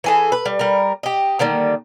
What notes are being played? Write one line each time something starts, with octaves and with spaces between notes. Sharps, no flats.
E3 G#4 A4
B4
G3
G3 A#4
G4 D#5
D3 D#3 G3 A#3